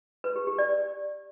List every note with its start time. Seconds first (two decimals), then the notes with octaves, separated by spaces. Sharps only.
0.24 B4
0.36 G4
0.47 G4
0.58 D5